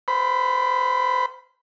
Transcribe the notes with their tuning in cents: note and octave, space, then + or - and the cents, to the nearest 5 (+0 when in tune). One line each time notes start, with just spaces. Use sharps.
C5 -25 B5 +0